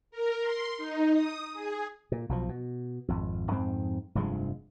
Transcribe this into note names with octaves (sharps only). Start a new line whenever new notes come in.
A#4
C6
D#4
D#6
G#4
A#2
B1 B2 F3
B2
G#1 F2
F2 G#2 C4
F1 G2 F3 G#3